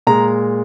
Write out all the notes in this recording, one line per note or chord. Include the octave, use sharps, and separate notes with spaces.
A#2 G#3 A#5